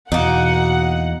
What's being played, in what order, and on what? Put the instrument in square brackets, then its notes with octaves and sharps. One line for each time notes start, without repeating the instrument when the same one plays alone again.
[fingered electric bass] E2 [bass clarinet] B2 [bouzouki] A#3 D#4 [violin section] F#5